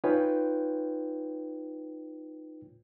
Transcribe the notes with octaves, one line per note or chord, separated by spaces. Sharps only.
D#4 F4 B4 C#5 G5 G#5